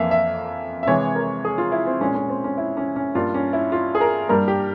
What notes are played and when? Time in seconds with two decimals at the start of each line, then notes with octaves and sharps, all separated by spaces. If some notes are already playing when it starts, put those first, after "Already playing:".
Already playing: F2 E3 A#3 E5 F5
0.11 E5
0.83 E5
0.87 C3 E3 G#3 C#5
1.15 A#4
1.45 G#4
1.58 F4
1.72 E4
1.87 C4
2.01 A#2 G#3 C#4
2.15 C#4
2.29 C4
2.44 C#4
2.58 E4
2.77 C#4
2.96 C#4
3.15 G2 G3 A#3 F4
3.34 C#4
3.53 E4
3.72 F4
3.95 G#4
4.01 A#4
4.28 G2 G3 A#3 A#4
4.48 G4